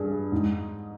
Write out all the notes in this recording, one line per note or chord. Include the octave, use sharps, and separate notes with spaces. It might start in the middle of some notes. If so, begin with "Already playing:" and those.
Already playing: G2 G#4
G#2